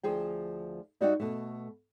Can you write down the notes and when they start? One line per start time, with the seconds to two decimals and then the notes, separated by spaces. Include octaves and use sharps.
0.03 D2 F3 G#4 G5
1.01 G3 D#4 F#4 D5 E5 G5
1.20 B2 A3